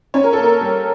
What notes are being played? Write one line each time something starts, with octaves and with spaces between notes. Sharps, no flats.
C#4 C#5
A#4
A4
A#3
A#4
G3